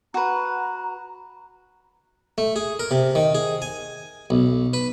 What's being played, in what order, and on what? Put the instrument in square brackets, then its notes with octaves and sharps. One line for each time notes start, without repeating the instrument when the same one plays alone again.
[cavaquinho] F#4 B4 [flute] A#5
[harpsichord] A3
G#4
A#4
C3
D#3
G#4
G#5
B1
B4